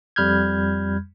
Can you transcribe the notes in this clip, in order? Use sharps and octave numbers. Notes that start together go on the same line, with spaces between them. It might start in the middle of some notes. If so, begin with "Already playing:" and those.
F2 G3 B5 F6 G6 G#6